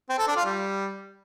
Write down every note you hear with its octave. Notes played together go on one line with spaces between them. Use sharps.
C4
A4
D4
F4
G3